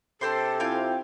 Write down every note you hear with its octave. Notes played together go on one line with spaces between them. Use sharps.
C3 D4 A4 C5 C6
C4 E4 F4 F5 G5 G#5